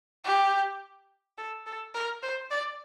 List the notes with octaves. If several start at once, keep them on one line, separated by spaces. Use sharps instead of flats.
G4
A4
A4
A#4
C5
D5